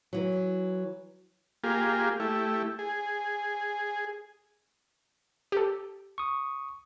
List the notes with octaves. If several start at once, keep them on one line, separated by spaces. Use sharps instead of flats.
E3 F#3
A#3 F4 G4 G#4
A3 E4 G4
G#4
G4 A4
C#6 D#6